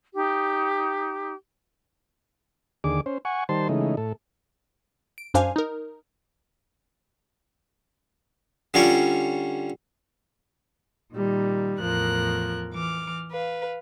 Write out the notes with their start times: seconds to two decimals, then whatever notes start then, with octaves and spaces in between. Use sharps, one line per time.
0.14 D#4 G4
2.84 D#2 D3 G#4 D6
3.06 C#4 C5
3.25 F#5 G#5 C#6
3.49 D#3 G3 C5 A5 C6
3.69 C#3 E3 G#3 A3 D#4
3.97 A2 A4
5.18 D7
5.34 F#2 D4 C5 F5 G#5
5.56 D#4 A#4
8.74 D3 G3 C#4 F4 C#5 D5
11.13 A#2 D#3 G3
11.81 E2 A2 F3 A#4 F#6
12.72 E3 D6 F6
13.31 B4 F5